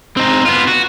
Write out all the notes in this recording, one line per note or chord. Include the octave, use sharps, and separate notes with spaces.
C4 D#4
B3 F4
F#4